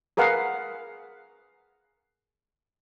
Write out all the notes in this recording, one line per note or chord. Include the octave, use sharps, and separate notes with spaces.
G#4 A#4 B4 F5 F#5